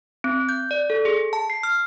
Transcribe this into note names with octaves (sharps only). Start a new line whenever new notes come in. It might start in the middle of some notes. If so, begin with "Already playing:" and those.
C4
G6
D5
A4
G#4
A5
C7
F6